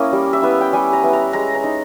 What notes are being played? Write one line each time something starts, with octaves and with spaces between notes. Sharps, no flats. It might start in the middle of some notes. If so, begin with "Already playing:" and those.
Already playing: A#3 C#4 E4 D#5
G3
E5
B3 E4
G5
G3 G#5
A#5
B3 E4
A#5
G#3 A#5
A#5
D#4